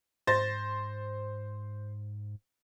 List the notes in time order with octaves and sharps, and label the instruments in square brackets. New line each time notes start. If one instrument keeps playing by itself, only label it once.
[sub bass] G#2 [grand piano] C5 A6 A#6